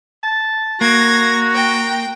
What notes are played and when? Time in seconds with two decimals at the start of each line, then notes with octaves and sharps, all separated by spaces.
0.23 A5
0.81 A#3 F#4 A#5 G#6 A#6
1.55 G5